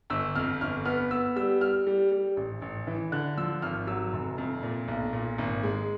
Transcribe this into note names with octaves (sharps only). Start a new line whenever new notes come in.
G1 E6
F2 F6
G1 F6
B3 F6
B3 E6
G3 E6
G3 F6
G3
G3
A1
A1
E3
D3 F#6
F3 E6
G#1 F6
F#3 E6
F1
F2
A#2
B1
A#2
G#1
G#3